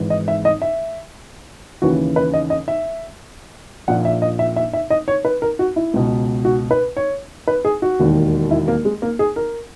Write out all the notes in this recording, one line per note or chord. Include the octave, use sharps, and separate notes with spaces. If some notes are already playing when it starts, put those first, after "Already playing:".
Already playing: G#1 G#2 E3
D#5
E5
D#5
E5
D#2 C#3 E3 F#4
B4
D#5
D#5
E5
A#1 A#2 F#5
E5
D#5
E5
E5
E5
D#5
C#5
B4
A#4
F#4
E4
C#2 B2
F#4
B4
C#5
B4
G#4
F#4
E1 D#2 D#3
E4
A#3
G#3
A#3
G#4
A#4